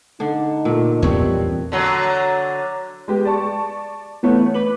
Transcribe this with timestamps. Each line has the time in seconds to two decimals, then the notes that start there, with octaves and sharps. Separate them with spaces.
0.20 D3 D4 D#4
0.65 A#2 A3
1.02 E2 G3 B3 C4 C#5
1.72 D3 F#3
3.08 G#3 B3 G4
3.25 D5 A5 C#6
4.23 E3 A3 B3 C#5
4.54 B4 D6 F#7